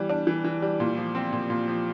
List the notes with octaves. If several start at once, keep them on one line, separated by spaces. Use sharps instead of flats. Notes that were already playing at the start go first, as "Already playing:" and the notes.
Already playing: E3 G3
D4
E3
E3
G3
A#2
F3
C4
A#2
A#2
F3